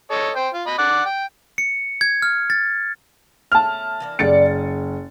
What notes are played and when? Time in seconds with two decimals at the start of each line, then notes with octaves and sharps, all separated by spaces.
0.11 A4 C#5 D#5
0.36 C5 G5
0.54 F4
0.67 D#5 B5
0.78 D5 F#5
1.06 G5
1.58 C#7
2.01 G#6
2.22 F6
2.50 A6
3.52 B2 A3 C#4 A5 F6
4.00 E3 A#3 D4
4.19 F#1 G3 A4 D5 A6 C#7
4.46 G#4